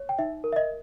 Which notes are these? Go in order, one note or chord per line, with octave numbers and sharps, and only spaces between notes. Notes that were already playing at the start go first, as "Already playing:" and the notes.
Already playing: C#5
G5
D#4 E5
A#4
E5
D#5